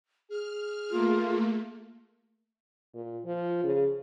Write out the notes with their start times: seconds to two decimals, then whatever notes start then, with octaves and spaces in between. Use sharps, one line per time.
0.29 G#4 F6
0.91 A3 A#3 F4
2.95 A#2
3.25 F3
3.64 C#3